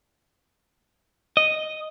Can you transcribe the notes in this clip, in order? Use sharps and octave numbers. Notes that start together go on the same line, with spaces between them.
D#5